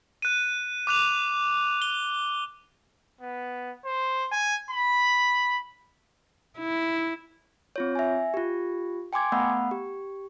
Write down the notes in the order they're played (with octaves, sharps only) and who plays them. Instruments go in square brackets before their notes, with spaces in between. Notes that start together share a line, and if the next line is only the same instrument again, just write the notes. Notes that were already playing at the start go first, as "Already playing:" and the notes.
[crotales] F#6 D#7
D6 F#6 F7
G7
[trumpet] B3
C5
G#5
B5
[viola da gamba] E4
[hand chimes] C4 F4 C#5
E5 G#5
F4 G4
G5 G#5 C6 D6 G#6
A3 B3 F#5 B5
G4